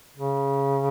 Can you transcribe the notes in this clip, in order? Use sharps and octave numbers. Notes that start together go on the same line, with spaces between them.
C#3